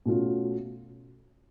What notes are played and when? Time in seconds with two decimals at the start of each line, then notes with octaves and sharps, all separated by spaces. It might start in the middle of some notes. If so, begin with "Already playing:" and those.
0.06 B2 A3 C#4 F4